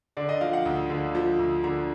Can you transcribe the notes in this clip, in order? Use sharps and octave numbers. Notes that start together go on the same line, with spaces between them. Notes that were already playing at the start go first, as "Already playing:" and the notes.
D3 D5
D#5
F3 F5
F#5
D2
D3
F3
D2
D3 A#5